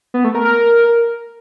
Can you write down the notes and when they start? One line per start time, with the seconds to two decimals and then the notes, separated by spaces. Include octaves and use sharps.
0.14 B3
0.24 A3
0.35 A#4
0.45 A#4